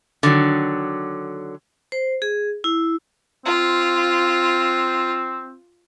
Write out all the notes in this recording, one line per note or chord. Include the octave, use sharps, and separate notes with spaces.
D3 D#3 F#3
C5
G#4
E4
C4 F4